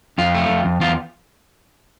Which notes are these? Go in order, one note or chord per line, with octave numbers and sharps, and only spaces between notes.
F2 F4
A3
F2
F2
E2 F4